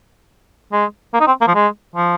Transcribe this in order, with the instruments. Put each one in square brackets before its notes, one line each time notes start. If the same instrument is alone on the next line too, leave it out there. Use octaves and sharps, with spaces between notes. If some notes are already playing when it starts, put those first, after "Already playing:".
[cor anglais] G#3
A#3
D#4
C4
A#3
F3
G#3
F3